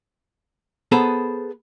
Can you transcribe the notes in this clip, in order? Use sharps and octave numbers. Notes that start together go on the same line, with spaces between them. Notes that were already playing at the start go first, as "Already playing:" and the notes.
B3 G#4 A4 C5 F#5 A#5